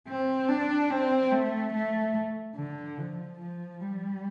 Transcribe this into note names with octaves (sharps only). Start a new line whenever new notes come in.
C4
D4
C4
A3
A3
D3
F3
F3
G3